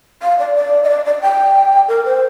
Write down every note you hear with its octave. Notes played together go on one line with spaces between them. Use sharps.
F5
D5
D5
D#5
D5
D5
G5
A#4
C5